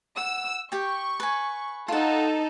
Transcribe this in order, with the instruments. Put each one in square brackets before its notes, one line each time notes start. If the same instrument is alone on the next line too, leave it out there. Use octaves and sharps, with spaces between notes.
[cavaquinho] F#5 [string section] E6
[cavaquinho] G4 G5 [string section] C#6
[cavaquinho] B4 G#5
[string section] D#4 A4 [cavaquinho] F4 F#5